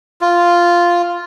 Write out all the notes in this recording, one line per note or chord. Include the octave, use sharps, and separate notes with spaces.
F4